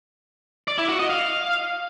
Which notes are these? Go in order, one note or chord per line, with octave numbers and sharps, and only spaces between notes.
D5
E4
F#4
D#5
F5